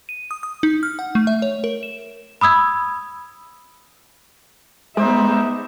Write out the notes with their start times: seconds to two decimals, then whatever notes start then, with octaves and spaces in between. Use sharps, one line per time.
0.09 D#7
0.31 D#6
0.43 D#6
0.63 D#4
0.83 F6
0.99 F#5
1.15 A3
1.27 E5
1.42 C#5
1.64 A#4
1.83 E7
2.41 B5 D#6 E6 G#6
4.97 G#3 B3 D#4 C5 D5 E5